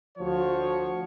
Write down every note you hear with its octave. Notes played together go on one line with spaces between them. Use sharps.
D2 F3 F#4 C#5